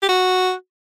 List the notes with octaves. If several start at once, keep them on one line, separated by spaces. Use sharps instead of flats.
G4
F#4